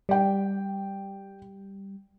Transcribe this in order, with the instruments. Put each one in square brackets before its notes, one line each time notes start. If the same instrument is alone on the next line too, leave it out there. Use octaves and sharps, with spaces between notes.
[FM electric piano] G3 [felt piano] D5 G5